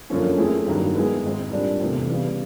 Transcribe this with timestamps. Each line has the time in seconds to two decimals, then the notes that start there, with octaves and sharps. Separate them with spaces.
0.10 F#2 D3 F3 A#3 C#4
0.37 A3 C4 E4 G#4
0.66 G2 D#3 F#3 A#3
0.94 G#3 B3 E4 G#4
1.24 G#2 D#3 G#3 C4
1.52 A#2 G3 A#3 D4
1.80 E2 C3 E3 A3 C4
2.08 C#3 E3 G3 B3